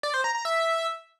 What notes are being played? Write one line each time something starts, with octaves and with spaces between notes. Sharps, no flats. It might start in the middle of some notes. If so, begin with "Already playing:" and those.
D5
C5
A#5
A#5
E5